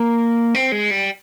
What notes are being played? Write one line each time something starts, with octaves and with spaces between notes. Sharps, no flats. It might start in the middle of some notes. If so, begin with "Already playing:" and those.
Already playing: A#3
C4
G#3
G3